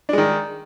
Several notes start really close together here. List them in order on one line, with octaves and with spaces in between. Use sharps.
D4 G#3 D#3